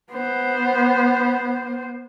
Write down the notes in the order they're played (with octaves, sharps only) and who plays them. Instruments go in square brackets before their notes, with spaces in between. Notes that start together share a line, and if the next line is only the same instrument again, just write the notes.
[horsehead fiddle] B3 C5